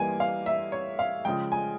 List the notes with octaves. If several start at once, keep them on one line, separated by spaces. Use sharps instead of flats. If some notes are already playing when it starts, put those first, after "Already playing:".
Already playing: E3 G3 A#3 G#5
F5
E5
C#5
F5
C#3 F3 G#3 G5
G#5